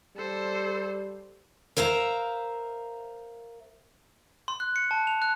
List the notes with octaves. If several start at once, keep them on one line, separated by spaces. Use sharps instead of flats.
G3 A4 C5
A#4 C5 E5 F5 A#5
C6
F#6
C#7
A5
F7
F#6